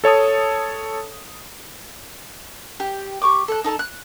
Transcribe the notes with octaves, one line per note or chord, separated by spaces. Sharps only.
A4 C#5 A5 D#6
G4
G4 C#6 D6
A4 F#6
D#4 A4 G#5 A5
F#6